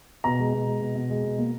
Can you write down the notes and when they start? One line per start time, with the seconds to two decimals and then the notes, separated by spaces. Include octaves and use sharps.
0.24 B2 A#5
0.39 G#3
0.54 B2
0.67 G#3
0.81 B2
0.95 B2
1.10 G#3
1.24 B2
1.38 A#3